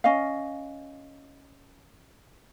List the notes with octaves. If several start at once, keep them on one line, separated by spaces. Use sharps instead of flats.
C#4 D#5 F5